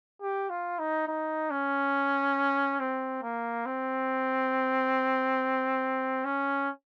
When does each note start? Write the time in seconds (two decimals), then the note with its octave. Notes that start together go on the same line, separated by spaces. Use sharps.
0.22 G4
0.50 F4
0.79 D#4
1.08 D#4
1.51 C#4
2.80 C4
3.23 A#3
3.66 C4
6.25 C#4